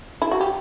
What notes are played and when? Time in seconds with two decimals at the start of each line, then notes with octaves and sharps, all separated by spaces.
0.22 E4
0.31 F#4
0.41 G4